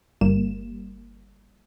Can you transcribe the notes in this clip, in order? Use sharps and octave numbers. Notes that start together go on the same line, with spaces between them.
G1 G3 A#3 E7